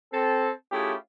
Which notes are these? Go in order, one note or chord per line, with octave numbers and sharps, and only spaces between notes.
C4 A4
A3 C#4 E4 F4 G4 G#4